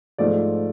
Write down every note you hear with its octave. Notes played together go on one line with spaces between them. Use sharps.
G#2 F3 A3 D5